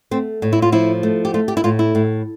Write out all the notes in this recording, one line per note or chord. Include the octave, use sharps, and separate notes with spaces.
A3 C4
A2
E4
F4
F3 E4
A3
G4
A3 F4
G4
E4
A2 F4
E4
A2